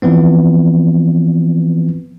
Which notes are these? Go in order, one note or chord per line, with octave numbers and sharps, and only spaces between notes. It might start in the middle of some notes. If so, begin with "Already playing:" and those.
E3 F3 B3 C4